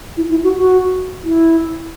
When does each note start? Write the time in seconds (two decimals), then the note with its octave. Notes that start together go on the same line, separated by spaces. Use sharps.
0.17 E4
0.30 E4
0.44 F#4
0.58 F#4
1.24 E4